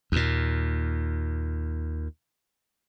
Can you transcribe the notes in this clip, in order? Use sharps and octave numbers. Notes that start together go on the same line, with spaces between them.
D#2 A#2